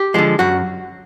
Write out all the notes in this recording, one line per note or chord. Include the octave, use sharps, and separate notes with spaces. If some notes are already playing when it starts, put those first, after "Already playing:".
Already playing: G4
D3 F3 G#3
F#2 F#4